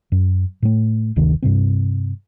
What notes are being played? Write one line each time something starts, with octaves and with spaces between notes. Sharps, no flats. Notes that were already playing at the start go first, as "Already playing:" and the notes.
F#2
A2 A3
F#1 D2 C3 D#3
G2 C3 C4